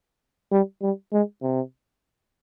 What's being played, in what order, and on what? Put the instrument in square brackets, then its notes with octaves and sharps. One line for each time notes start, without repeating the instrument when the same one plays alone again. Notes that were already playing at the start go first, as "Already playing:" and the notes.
[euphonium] G3
G3
G#3
C3